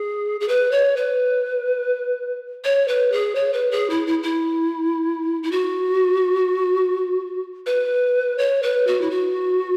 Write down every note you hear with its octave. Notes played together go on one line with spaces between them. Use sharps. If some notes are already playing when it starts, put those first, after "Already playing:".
Already playing: G#4
G#4
B4
C#5
B4
C#5
B4
G#4
C#5
B4
G#4
E4
E4
E4
E4
F#4
B4
C#5
B4
F#4
E4
F#4